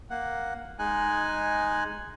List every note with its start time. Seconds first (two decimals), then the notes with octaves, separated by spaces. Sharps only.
0.10 A#3 F#5
0.79 G#3 D#4 G#5 F#6